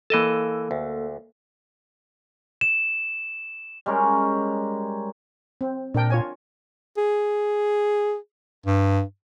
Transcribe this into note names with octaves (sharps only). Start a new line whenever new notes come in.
E3 A#3 A4 D#5 A5
D2
E7
G3 G#3 C#4 A#4
C4
A#2 D4 A#4 G5
F4 C#5 G#5
G#4
G2